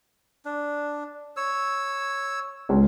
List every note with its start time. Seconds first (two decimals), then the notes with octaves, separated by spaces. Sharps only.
0.45 D4
1.37 C#5 E6
2.69 C#2